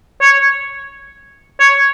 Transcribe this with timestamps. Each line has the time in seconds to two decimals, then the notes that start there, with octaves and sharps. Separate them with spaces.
0.21 C#5
1.60 C#5